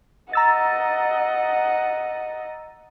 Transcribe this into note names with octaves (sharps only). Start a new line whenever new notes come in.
D#5 F#5 A#5 E6 A6